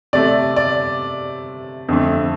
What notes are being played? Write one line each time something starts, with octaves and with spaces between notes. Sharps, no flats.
C3 A3 D5
D5
F2 D3 A3